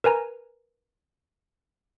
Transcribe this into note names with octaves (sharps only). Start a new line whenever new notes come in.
A#4 B4 G#5 A#5